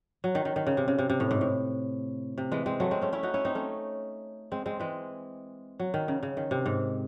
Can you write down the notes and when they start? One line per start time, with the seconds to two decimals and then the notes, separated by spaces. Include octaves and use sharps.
0.24 F#3
0.35 D#3
0.45 D#3
0.56 D#3
0.67 C#3
0.77 C3
0.88 C#3
0.99 C3
1.10 C3
1.20 A2
1.31 G#2
1.41 A2
2.38 C3
2.52 E3 G#3
2.66 G#3 C4
2.80 F#3 A3
2.91 G#3 C4
3.01 A3 C#4
3.13 C#4 E4
3.23 D#4 F#4
3.34 C#4 E4
3.45 C4 D#4
3.55 A3 C#4
4.52 G#3 C4
4.66 G#3 C4
4.80 E3 G#3
5.80 F#3
5.94 D#3
6.08 C#3
6.23 C#3
6.37 D#3
6.51 C3
6.66 G#2